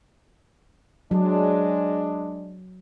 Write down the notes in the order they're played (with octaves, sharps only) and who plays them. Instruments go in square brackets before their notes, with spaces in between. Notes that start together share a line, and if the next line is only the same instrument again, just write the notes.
[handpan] F#3 [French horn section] G#3 D4